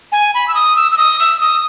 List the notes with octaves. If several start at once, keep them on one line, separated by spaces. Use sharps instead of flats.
G#5
B5
E6
D#6
E6
E6
D#6
E6
D#6